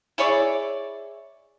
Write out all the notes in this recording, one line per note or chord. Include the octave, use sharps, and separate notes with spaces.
E4 G#4 C#5 D5